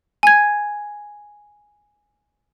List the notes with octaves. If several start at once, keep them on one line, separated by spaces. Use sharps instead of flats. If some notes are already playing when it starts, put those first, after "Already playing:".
G#5 G#6